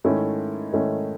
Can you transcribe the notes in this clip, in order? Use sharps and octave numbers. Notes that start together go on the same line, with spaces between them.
G#2 D#3 A3 C#4 E4
G#2 D#3 A3 C#4 E4